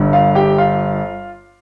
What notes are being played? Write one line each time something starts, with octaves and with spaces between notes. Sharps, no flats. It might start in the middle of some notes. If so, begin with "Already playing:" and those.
Already playing: G1 G2 D3
F4 F5
G4 G5
F4 F5